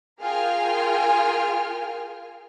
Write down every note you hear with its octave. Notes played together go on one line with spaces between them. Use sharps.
F4 G#4 A#4 G5 G#5 F6